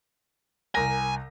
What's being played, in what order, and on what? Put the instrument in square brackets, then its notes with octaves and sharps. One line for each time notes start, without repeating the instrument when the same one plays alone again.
[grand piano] C2 A#4 A#6 [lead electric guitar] G#5